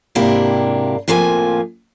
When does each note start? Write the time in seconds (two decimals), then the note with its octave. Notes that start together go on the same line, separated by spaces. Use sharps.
0.15 G#2 C3 A#3 D4 E4 G4
1.08 A2 C3 F3 A#3 E5 G#5